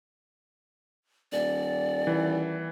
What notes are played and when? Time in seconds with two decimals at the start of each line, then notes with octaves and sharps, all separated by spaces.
1.32 D#1 D5
2.07 E3